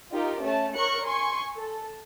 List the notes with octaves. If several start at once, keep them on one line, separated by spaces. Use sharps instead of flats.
D#4 F4 G4 A#4
A3 C#4 C#5 A5
A#4 C#5 C#6 F#6 C#7
G#5 C6 C#6
A4